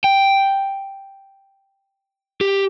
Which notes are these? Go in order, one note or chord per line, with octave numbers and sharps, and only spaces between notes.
G5
G4